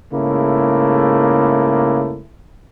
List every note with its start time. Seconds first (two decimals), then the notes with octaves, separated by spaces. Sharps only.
0.13 G#2 C#3 A3 A#3 E4